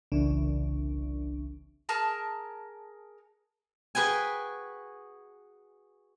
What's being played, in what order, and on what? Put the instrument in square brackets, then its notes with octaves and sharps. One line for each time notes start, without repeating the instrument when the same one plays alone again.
[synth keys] G1 C2 E3 [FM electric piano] C#3 D4
[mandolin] G#4 A#4 A5 F6
[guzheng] F#4 G#4 B4 G5 G#5